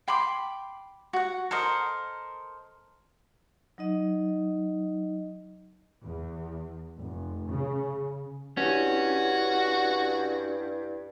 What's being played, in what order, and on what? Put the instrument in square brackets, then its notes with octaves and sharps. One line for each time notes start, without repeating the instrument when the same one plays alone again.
[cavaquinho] G5 B5 C6 D6
F#4 F#5
A4 A#4 C5 D#5
[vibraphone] F#3 D#4 D#5
[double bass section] E2
F1
C#3
[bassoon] G2 [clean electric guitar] C#4 [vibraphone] D4 E4 G4 [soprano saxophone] F#4